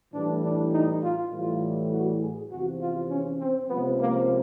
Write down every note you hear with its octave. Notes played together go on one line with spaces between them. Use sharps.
A2 E3 G3 D4
D4
D#4
F4
A2 E3 G3 F4
F#4
G#4
E2 C3 F3 F#4
F4
C#4
C4
C#2 C3 F3 B3
A#3